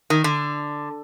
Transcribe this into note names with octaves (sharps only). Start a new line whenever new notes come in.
D#3
D3